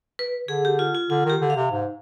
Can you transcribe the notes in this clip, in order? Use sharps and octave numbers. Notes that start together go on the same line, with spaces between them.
B4
D3 G#4
G4
F4
F4
D3 F4
D#3 G4
D3
F5
C3
G#2